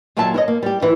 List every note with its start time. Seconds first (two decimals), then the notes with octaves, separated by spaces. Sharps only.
0.17 D#2 A#2 F#3 G4 E5 A5
0.34 E4 C#5 D#5
0.48 A#3
0.63 G3 G4
0.81 D2 E3 E4